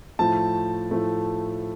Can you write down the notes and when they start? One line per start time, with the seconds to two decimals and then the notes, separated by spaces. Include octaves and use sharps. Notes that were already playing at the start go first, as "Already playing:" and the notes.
0.19 A2 F3 A3 A5
0.91 A2 F3 A3